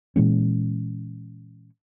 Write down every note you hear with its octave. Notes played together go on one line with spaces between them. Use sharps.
A#2 E3 G#3 C#4